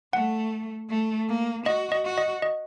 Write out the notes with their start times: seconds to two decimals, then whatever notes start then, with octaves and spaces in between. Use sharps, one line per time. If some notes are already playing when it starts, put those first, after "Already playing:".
0.13 A3 F#5
0.90 A3
1.28 A#3
1.66 F#4 D#5
1.92 D#5
2.05 F#4
2.18 D#5
2.42 D#5